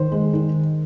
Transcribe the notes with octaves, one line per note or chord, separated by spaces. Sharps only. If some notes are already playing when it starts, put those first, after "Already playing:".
Already playing: D#3 C5
G#3
D#3